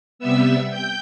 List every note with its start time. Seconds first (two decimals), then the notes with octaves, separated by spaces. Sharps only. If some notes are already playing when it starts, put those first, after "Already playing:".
0.19 C3 G3 B3 E5 E6
0.71 G5 G6